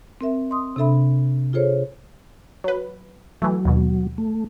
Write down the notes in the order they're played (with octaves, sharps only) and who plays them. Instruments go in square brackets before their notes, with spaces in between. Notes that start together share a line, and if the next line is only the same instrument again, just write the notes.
[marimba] C4 A#4 E5
D#5 C6 D#6
C3 D4 A4 E5 B5
F4 G#4 A4 C5 C#5
[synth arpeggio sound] F#3 B4
[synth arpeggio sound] E3 A3 [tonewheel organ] F#3
[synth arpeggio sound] D#2 B2
[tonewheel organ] A3